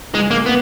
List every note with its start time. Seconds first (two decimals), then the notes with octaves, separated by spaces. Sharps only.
0.15 G#3
0.31 A#3
0.46 B3